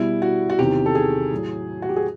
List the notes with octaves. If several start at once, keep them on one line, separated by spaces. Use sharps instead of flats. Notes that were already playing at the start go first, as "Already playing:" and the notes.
Already playing: B2 G3 E4
F#4
F#4
E2 C3 D#3 G4
A4
G#4
A2 F#3
F#4
G4
G#4